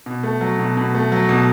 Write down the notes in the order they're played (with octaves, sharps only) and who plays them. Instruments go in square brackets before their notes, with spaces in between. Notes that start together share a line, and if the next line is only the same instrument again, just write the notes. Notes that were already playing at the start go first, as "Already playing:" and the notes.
[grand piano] B2
A3
F#3
B2
B2
A3
F#3
B2